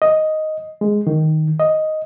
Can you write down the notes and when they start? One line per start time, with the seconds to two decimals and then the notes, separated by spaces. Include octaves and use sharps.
0.02 D#5
0.81 G#3
1.07 D#3
1.59 D#5